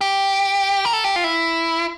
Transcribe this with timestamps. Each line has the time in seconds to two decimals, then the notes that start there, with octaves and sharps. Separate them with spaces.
0.01 G4
0.85 A#4
0.93 A4
1.04 G4
1.16 F4
1.24 E4